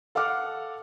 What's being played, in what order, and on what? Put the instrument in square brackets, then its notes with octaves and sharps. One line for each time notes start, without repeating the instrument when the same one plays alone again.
[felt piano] A4 F5 F#5 D6 F6